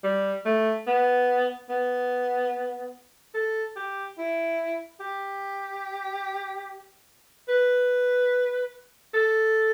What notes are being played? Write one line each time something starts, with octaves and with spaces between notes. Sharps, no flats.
G3
A3
B3
B3
A4
G4
E4
G4
B4
A4